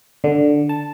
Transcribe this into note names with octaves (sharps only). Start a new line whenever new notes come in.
D3
A5